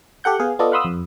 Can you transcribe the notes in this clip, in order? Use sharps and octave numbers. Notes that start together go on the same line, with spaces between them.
G4 A4 F#5 G6
B3 G#4 F5
B3 F4 A4 D5 D#5
F5 F#5 B5 C6 D#6 E6
F2